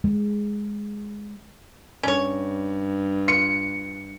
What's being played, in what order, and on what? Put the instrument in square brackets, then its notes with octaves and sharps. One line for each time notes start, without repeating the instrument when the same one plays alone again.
[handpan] G#3
[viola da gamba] G2 [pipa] C#4 C#5
[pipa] F4 [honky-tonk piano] C#7